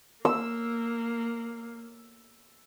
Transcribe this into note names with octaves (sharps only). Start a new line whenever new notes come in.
A#3 E6